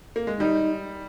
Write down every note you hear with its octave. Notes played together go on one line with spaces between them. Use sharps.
A#3
G#3
G3 D#4